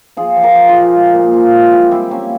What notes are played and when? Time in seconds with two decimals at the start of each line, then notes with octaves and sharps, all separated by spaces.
0.17 F3 F4 G#4
0.37 F3
0.43 G4 A#4
0.56 F3
0.69 F4 G#4
0.75 F3
0.95 G#3
1.14 A#2
1.34 F3
1.53 G#3
1.72 G3 E4 G4
1.91 G3 C4 E4
2.11 G3 A#3 C#4